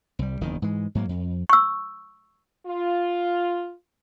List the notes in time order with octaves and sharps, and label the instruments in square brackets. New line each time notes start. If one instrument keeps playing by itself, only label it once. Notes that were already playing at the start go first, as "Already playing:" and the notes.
[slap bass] C2 G3
F#1 E2 D#3
G#2 E3 G#3
G#2 F#3 A#3
F2
[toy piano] C#6 E6
[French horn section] F4